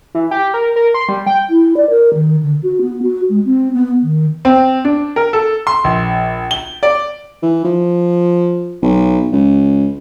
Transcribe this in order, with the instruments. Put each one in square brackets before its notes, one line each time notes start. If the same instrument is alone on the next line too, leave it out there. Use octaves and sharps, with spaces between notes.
[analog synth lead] E3
G4
A#4
A#4
C6
G3
G5
[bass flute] E4
D5
A#4
D#3
D3
F#4
B3
F#4
G#3
C4
B3
D#3
[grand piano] C4
D4
A#4
A4
C6
A#1
G7
D5
[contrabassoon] E3
F3
B1
C#2